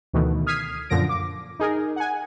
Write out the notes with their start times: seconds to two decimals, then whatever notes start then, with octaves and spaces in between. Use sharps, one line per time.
0.14 D2 B2 D#3 E3 A3
0.47 D#6 F6 G#6 B6 C7 D#7
0.90 F#2 A#2 D3 F3 A#6 D7
1.09 D6
1.60 D#4 G#4 A#4
1.96 F#5 G#5